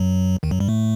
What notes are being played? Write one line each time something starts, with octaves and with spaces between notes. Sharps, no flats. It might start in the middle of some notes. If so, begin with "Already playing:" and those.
Already playing: F#2 F#3
D#2 D#3
F#2 F#3
G2 G3
A2 A3